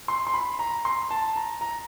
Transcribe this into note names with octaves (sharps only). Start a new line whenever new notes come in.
C6
C6
B5
A#5
C6
A5
A#5
A#5